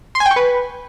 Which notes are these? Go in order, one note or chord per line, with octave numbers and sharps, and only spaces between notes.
C6
G#5
G5
C#6
B4